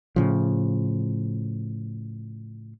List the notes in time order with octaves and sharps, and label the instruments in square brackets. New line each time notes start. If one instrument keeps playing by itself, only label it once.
[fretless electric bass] A2 C#3 F3